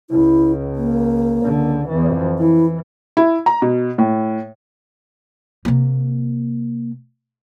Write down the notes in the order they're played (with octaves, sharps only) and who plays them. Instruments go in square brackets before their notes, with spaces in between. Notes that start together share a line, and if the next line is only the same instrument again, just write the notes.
[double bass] C#2 [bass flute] E4
[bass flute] A#3
[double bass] C#2 D3
F2 E3
[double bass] E3 [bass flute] E4
[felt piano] E4
A#5
B2
A2
[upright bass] C3 A#3